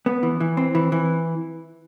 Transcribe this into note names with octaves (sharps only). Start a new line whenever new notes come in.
B3
E3
E3
C4
E3
E3